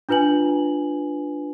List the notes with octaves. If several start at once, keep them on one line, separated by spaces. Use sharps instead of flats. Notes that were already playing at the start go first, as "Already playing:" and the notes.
D4 F4 B4 G#5 F#7